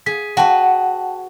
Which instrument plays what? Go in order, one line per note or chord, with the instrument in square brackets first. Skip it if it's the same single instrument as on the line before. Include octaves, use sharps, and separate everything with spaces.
[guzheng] G#4 [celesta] B6
[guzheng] F#4 B4 [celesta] F#5 G5 A5